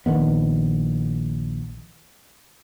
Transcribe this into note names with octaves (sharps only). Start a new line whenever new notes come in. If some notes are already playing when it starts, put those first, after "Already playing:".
A#1 D#3 B3